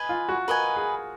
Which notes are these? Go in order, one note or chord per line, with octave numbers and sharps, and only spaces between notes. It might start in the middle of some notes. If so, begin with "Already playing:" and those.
Already playing: B4 D#5 G#5
F4
F#4
A#4 B4 D#5 G#5
G#4